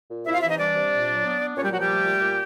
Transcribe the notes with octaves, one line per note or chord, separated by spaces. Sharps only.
A#2
C3 E4 E5
F4 F5
E3 E4 E5
D#4 D#5
G3 D4 D5
C3
A#2
F#3
B3
D4
A#2 C#4 C#5
G3 G4
F3 F#3 F#4
G3 G4
A3
A#2
A#2